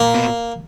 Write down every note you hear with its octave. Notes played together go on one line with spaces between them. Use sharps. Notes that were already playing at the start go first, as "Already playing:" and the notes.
Already playing: A#2 A#3
B2